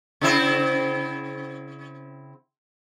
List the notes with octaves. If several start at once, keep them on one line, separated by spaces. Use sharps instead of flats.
C#3 C4 E4